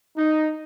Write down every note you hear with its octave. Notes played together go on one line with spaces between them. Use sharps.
D#4